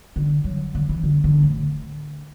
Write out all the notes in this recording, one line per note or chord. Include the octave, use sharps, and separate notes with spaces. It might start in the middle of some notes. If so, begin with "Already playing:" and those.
D3
F#3
D3
E3
D3
D3
A2